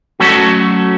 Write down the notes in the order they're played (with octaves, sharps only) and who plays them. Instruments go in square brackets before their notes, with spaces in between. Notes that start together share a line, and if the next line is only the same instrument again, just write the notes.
[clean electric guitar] F#3 A3 C#4 F#4 A4